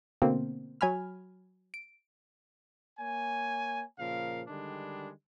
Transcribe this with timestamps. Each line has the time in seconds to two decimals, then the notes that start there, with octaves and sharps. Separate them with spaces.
0.22 B2 D3 A#3 C4
0.81 F#3 G#5 B5 F6
1.74 D7
2.99 A#3 C#5 G#5
3.99 A#2 C#3 F3 A#4 F5
4.48 D3 D#3 G3 G#3 D4